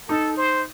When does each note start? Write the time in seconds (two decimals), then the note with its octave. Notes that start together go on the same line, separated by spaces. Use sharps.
0.09 D#4 A4
0.37 C5